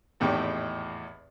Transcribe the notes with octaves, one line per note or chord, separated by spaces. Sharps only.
G#1 E2 A2 D#4 G4 G5